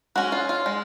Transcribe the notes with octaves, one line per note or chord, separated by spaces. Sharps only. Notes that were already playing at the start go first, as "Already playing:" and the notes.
G#3 C#4 F#4
F4
F4
G#3